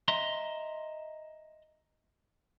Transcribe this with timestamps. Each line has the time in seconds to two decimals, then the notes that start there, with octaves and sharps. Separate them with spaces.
0.08 D#5 E5 A#5 C6